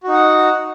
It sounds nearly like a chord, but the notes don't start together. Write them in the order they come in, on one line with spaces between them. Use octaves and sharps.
F#4 D#4 F#5